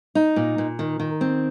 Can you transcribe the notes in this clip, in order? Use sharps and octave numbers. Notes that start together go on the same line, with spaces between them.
D#4
A#2
A#2
D#3
D#3
C4